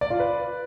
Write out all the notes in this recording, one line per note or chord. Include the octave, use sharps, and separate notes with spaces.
D5
F4
B4